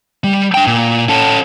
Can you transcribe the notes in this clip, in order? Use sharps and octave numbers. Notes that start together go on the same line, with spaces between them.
G3
D4 G5
A#2
C#4 A4